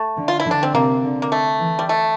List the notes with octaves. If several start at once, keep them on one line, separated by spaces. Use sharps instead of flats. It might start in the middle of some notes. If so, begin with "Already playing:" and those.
Already playing: A3
D3
F4
E4
D3
D4
C4
C3 A#3
D3
A#3
A3
E3
G3
A3